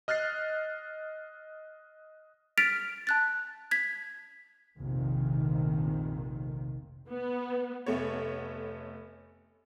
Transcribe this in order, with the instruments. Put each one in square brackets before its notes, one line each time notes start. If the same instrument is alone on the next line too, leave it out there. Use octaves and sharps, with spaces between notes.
[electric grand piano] D#5 F6 F#6 A6 C7
[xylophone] F6 A6 B6 D7 F7
A5 F#6 A6
G#6 B6
[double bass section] F1 A#1 C3 D#3
[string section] B3
[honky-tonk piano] F1 A3 B3 C#5